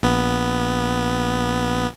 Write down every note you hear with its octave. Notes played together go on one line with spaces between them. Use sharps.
A#1 B3